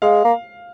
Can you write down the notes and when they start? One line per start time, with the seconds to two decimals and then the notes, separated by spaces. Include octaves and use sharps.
0.02 G#3 F5
0.24 A#3